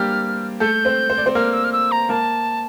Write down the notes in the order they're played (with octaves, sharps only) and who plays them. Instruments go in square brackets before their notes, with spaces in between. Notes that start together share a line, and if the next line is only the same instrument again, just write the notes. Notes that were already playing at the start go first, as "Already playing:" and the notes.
Already playing: [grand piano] G3 A#3 C4 D4 G4 C5 [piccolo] F6
[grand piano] A3 A4 [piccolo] G6
[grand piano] C4 C5
C5
D5
C4 C5
[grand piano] A#3 A#4 [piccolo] F6
[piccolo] E6
F6
E6
A#5
[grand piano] A#3 A#4 [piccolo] A5